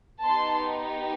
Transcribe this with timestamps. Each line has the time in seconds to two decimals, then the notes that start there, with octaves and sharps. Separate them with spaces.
0.24 B3 D#4 G4 A5 C6